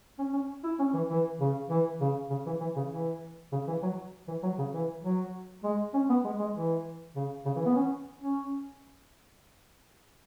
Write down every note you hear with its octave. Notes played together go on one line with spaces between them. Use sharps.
C#4
C#4
E4
C#4
E3
E3
C#3
E3
C#3
C#3
E3
E3
C#3
E3
C#3
E3
F#3
E3
F#3
C#3
E3
F#3
G#3
C#4
B3
G#3
G#3
E3
C#3
C#3
E3
B3
C#4
C#4